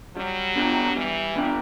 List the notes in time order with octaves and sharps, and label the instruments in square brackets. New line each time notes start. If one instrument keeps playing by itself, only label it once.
[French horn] F#3 [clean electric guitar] G3
[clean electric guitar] B3 D4 G4 D5
[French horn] E3 [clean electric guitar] G3
[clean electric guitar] B3 D4 G4 D5